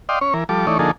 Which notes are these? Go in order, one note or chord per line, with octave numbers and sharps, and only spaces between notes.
D5 D#5 F5 G5 C6
C#4 C#5
E3 A#4
F3 G3 A4 D6
E3 A3 D#4 C#5 D5
D3 F3 A#3 D#4 G#4 A4